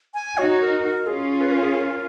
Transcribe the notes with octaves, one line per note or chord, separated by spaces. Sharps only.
G#5
D#4 F#4 C#5
A#4
A#4
C#4 F4 G#4
B4
A#4
G#4
A#4